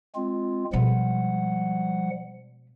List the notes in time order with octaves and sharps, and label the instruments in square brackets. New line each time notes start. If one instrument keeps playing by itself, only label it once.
[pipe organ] G#3 C4 F4
[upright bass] B2 G#3 [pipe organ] F3 G3 F#5